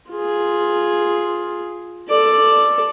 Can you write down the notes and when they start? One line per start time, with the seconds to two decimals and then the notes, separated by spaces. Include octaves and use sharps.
0.11 F4 G#4
2.09 A4 D5